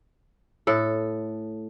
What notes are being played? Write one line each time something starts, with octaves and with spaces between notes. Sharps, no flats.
A2 A4